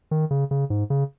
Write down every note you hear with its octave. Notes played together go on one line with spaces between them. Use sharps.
D#3
C#3
C#3
G#2
C#3